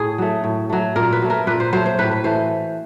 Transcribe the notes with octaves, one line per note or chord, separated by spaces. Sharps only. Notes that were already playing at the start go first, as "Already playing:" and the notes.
Already playing: A2 G#4
F#3 A3
A2
F#3 A3
A#2 A#4
B4
F#3 A3
A#4
A#2 B4
C5
F#3 A3 C5
C5
A2 B4
B4
E3 A3 C5